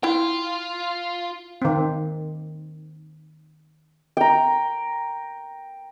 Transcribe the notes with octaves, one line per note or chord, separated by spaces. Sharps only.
E4 F4 G5
D#3 C4
G5 A#5